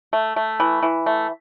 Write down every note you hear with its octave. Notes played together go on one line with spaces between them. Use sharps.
A3
A3
E3
E3
A3